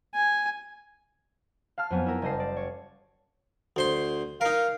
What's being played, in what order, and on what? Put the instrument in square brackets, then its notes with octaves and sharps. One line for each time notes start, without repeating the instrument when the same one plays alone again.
[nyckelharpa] G#5
[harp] F5 A5 F6
F2 F#3 B3 G#5
E4 A#4
F#1 G3 D#5 A5 C7
D5
C#5
[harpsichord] D2 C5 C6
[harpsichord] D#4 A#4 [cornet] F5